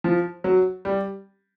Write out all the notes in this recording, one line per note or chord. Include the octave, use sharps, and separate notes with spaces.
F3
F#3
G3